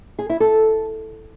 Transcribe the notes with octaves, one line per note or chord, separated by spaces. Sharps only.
G#4
E4
A4